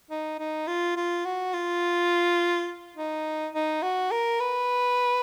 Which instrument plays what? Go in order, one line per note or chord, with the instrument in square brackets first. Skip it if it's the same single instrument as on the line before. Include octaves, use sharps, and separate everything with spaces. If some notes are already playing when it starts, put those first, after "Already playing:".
[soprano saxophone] D#4
D#4
F4
F4
F#4
F4
D#4
D#4
F#4
A#4
B4